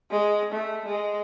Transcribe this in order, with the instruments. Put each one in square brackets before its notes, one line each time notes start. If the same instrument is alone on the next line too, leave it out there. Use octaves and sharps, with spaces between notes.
[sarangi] G#3
A3
G#3